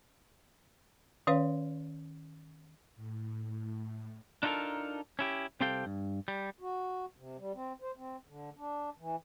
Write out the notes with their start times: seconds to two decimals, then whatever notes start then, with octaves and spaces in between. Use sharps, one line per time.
1.27 D#3 C#4 B4 C#5 F5
2.96 A2
4.43 D4 D#4 F4 F#4 A4 A#4
5.19 C#4 E4 G4
5.61 C2 C4 G4 A4 F5 G5
5.86 G2
6.28 G3
6.60 F#4
7.16 C3
7.38 G3
7.54 C4
7.82 C5
7.97 C4
8.28 D3
8.57 D4
8.99 E3